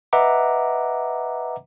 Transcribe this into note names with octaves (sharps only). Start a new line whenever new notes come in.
B4 D#5 E5 F#5 A#5 D6